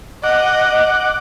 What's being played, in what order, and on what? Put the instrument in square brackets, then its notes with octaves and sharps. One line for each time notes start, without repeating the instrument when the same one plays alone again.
[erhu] D#5 [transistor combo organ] F#5 D6